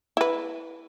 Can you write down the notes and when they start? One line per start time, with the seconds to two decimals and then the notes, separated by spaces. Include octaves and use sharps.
0.17 E4 B4